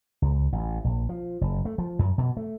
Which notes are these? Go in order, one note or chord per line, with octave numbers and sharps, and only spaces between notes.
C#2
A1
A#1
F3
F#1
A3
F3
F#2
B2
A3